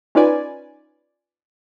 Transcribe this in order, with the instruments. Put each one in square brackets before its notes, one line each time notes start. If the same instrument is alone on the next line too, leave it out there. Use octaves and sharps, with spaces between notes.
[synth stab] C#4 D#4 F4 B4 D5 G#5